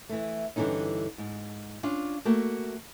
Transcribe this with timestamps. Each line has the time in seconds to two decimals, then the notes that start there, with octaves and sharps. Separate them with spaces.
0.09 E3 A3
0.56 G2 D3 E3 F#3 C#4 D#4
1.18 G#2
1.83 C#4 D4 F4 F5
2.25 A3 A#3 F#4